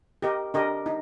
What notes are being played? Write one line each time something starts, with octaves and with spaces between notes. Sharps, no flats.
G4 A#4 D#5
D4 G4 A#4 D#5
D#4